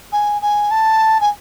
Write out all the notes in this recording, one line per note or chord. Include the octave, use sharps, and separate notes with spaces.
G#5
G#5
A5
G#5